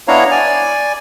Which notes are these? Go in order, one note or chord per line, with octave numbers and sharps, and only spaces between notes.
B3 D4 E4 C#5 F5 A#5
D5 G#5